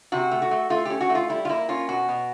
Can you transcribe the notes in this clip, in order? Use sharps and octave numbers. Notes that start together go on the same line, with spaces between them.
C3 F#4
A3
F#4
A3
A3 F4
C#4 G4
F#4
A3
F4
G3 E4
F4
A#3 E4
C#4 F4
B2 F#4
B2